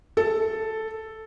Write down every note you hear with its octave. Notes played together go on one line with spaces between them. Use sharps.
A4